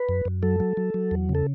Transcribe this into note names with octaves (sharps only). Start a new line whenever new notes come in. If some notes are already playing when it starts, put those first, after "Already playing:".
Already playing: B4
F#2
F#2
F#3 A4
F#3
F#3
F#3
E2
C#3
A4